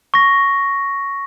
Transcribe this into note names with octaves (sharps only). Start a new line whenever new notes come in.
C#6 A#6